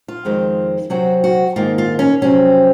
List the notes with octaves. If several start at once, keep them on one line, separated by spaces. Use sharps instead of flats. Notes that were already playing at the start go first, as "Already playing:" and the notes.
F4
F2 D#3 G#3 C4
C3 F#3 C4 F#4
F#4
G#2 D#3 A#3 F4
F4
C#4
F2 C3 F#3 C4 C#4